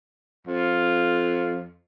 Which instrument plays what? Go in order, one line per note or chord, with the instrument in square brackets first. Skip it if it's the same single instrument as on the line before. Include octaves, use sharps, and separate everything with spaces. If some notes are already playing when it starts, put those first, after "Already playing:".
[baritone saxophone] F2 [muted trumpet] F4